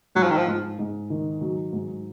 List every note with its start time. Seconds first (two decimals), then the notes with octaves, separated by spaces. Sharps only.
0.15 G#2 F#3
0.23 F3
0.30 D#3
0.37 F3
0.47 G#2
0.79 G#2
1.10 D#3
1.41 F#3
1.73 G#2